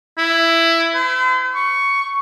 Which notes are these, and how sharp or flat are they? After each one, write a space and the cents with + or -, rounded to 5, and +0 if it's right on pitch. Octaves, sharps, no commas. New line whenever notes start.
E4 +10
C5 -45
C#6 +10